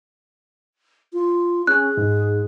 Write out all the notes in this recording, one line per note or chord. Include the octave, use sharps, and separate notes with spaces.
F4
C#4 G#4 F#6
G#2